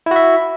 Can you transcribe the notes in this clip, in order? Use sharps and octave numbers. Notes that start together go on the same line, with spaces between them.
E4 F#4 E5